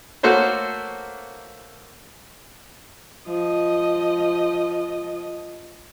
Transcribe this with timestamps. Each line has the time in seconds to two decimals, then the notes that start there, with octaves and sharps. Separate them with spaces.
0.23 A3 A#3 F#4 A4 C5 C#5
3.27 F3 D#5